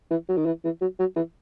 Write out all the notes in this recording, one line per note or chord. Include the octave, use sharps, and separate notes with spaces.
E3
F#3
D#3
E3
E3
F#3
F#3
E3